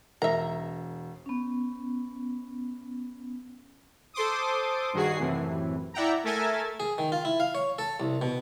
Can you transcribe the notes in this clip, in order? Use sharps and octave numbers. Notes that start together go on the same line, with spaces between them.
E1 A#4 E5 A#5
B3 C#4
A4 C5 C6 D6 D#6
G2 D#3 F#4 G#4 C7
F#2 A2 C3 E3
E4 D5 E5 F#5 G5 A#5
A3 A4 A#4 E5 G#5 A6
G#4
D#3
F4
E4
F5
C#5
A4
C2
B2